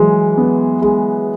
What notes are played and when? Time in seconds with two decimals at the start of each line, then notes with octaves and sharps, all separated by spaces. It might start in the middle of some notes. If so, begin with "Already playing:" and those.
Already playing: E3 F#3 G#3
0.37 B3
0.82 G#3